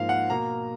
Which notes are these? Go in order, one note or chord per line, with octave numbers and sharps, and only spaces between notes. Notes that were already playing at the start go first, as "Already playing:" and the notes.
Already playing: G#2 F3 A#3 F5
F#5
B2 A#3 A#5